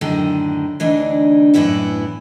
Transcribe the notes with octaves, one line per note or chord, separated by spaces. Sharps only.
F#2 A2 D3 D#3 G4 A#5
D2 E3 C4 D4 D#4
F#2 A2 C#3 E3 B3 E4